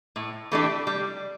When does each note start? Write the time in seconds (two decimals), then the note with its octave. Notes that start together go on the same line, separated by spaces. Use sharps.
0.16 A2
0.52 E3 A3 D4 G4
0.87 G3